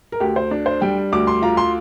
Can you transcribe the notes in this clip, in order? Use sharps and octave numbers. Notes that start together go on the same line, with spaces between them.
A#4
D2 G4
C5
D4
C5
G3 G5
D2 D6
C6
F4 A#5
C6